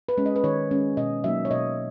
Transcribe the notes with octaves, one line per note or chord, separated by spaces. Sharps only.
B4
G#3 C#4
D#5
B4
D#3 C#5
G#3 C#4
B2 D#5
F#3 A#3 D#4 E5
C#5
B2 D#5